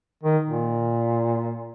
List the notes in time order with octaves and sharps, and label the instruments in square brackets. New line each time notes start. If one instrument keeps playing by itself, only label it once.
[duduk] D#3
A#2